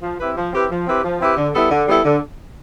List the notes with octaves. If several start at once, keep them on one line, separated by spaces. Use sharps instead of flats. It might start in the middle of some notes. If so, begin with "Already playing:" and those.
F3
C4 E4 G4 B4
F3
C4 E4 G4 B4
F3
C4 E4 G4 B4
F3
C4 E4 G4 B4
D3
G3 B3 E4 A4
D3
G3 B3 E4 A4
D3